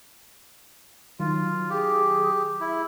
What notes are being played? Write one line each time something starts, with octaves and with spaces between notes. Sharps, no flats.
D#3 F#3 F4
G4 G#4
E4